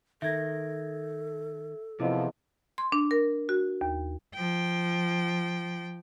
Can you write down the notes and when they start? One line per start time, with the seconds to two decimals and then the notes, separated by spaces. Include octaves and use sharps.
0.22 D#3 A4 E5 G#6 A#6
2.00 E2 C3 F3 E4 D#5
2.78 C6
2.92 D4
3.11 A#4
3.49 F#4
3.81 D#2
4.35 F3 G5